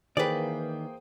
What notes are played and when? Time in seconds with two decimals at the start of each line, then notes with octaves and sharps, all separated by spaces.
0.17 D#3 E3 A#3 G#4 B4 C5 D5 G5